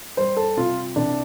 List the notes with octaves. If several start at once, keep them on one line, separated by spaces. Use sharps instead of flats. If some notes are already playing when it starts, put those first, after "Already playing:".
G3 C5
A4
C3 F4
C2 D4